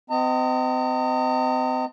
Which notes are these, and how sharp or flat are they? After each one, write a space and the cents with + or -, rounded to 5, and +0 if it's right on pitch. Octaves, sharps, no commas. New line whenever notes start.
C4 -40 D#5 +0 A#5 -45